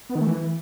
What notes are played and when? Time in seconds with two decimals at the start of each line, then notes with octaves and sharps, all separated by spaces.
0.09 B3
0.15 D#3
0.21 A3
0.27 E3